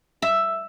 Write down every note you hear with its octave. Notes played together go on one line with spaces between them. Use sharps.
E5